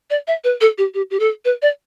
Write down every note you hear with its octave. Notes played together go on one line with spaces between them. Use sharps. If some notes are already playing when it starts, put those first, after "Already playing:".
D5
E5
B4
A4
G4
G4
G4
A4
B4
D5